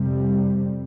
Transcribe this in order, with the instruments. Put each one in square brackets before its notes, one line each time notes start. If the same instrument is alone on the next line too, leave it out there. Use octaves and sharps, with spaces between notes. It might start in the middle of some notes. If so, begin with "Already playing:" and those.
Already playing: [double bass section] F2 C3 G3